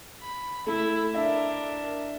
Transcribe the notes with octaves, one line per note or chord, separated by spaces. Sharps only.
B5
A3 E4
D4 A#4 E5